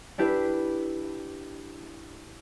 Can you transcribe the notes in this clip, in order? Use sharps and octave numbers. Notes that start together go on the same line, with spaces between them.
D4 E4 G4 B4